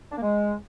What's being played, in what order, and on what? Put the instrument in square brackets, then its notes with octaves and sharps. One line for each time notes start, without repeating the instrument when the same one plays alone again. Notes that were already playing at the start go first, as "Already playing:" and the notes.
[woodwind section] D4
A#3
G#3